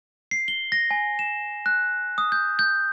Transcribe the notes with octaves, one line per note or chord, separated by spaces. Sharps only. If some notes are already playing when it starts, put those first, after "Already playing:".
C7
G7
A#6
G#5
E7
F#6
D#6
G6
G6